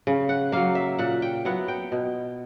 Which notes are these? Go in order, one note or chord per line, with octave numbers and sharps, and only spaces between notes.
C#3
F#5
F#3 A#3 F5
E5
A#2 F#5
G5
F#3 B3 E4 F#5
G5
B2